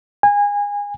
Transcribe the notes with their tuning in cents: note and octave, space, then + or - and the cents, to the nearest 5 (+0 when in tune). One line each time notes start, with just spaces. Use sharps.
G#5 -25